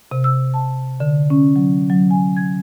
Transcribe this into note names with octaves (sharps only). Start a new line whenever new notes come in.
C3
E6
A5
D3
C#4
F#3
F#3
G#5
G#6